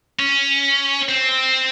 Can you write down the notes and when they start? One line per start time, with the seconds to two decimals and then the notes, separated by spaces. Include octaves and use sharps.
0.19 C#4
1.09 C4